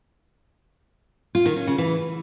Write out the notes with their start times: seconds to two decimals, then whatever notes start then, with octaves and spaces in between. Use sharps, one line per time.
1.35 F4
1.46 D#3
1.57 C#4
1.67 C#3
1.78 E3